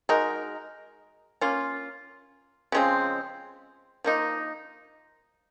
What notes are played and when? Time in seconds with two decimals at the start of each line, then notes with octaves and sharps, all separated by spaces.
0.09 G#3 D#4 F#4 A#4
1.41 A#3 C#4 F4
2.72 C#3 F3 G#3 C4
4.04 F3 A#3 D#4